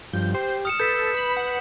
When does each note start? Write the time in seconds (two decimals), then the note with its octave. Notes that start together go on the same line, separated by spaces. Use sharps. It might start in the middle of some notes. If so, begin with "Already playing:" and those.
0.13 G2 F3 G6
0.34 G4 C5
0.65 D#6 F6 C#7 E7
0.80 A4 B4 G6 B6 E7
1.15 B5
1.37 F#5